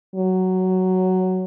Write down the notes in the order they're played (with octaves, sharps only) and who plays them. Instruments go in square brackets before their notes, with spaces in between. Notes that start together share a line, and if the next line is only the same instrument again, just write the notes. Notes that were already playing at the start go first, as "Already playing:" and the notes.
[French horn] F#3